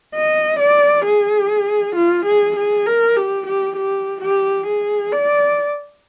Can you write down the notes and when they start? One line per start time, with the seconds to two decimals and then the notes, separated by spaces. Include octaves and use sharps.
0.15 D#5
0.60 D5
1.05 G#4
1.96 F4
2.26 G#4
2.56 G#4
2.86 A#4
3.17 G4
3.47 G4
3.76 G4
4.21 G4
4.67 G#4
5.12 D5